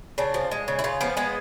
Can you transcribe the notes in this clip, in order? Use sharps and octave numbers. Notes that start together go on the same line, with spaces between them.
C#3 D4
F3
G#3
C#3
E4
C#3 F4
F3 B3
G#3 B3